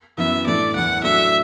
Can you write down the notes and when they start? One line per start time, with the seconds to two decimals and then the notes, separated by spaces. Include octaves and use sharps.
0.17 F#2 E3 B3 E5
0.47 A2 E3 D4 A4 D5
0.75 F#1 E2 E3 F#5
1.03 A2 F#3 D4 A4 E5